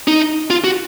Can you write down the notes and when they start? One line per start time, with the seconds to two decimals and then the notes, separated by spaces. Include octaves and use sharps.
0.08 D#4
0.50 F4
0.64 F#4